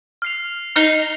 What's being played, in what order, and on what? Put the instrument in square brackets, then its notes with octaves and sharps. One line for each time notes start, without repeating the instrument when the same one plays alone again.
[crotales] F6 C7 F7
[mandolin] D#4 [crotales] F6 C7 F7